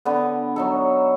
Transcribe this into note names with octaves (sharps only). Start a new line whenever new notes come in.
D3 B3
F#3 D#4 A4